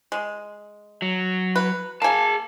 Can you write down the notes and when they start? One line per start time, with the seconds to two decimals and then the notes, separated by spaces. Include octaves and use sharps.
0.12 G#3
1.02 F#3
1.56 B4
2.02 A#3 G#4 G#5 A5